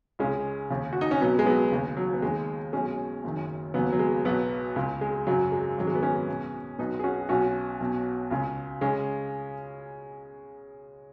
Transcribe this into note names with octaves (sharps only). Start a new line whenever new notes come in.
C#2 C#3 G#3 C#4
D#2 C#3
F#4
D#4
C#4
B1 B2 F#3 B3
G#3
F#3 B3
D#2 C#3
F#3
B3
D#2 D#3 G#3
B1 B2 G#3 C#4
F#1 F#2 D#3
D#2 C#3 F#3 B3
F#3
G#3
B1 B2 F#3 B3
C#2 C#3
G#3
G#1 F#2 C#3 F#3
G#3
G#1 F#2 D#3 F#3
G#3
B3
G#3 C#4
B1 B2
B1 B2 B3 D#4
G#4
C#4 F#4
B1 B2 C#4 F#4
B1 B2
C#2 C#3
C#3 G#3 C#4